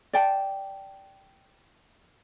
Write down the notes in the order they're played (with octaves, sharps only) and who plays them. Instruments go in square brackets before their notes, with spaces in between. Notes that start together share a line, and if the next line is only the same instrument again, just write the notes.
[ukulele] D5 G5 A5